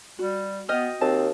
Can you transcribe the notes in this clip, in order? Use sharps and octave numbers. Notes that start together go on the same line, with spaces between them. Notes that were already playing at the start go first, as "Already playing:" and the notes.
G3 F#4
B3 D#5 G5 F6
D#2 C4 A5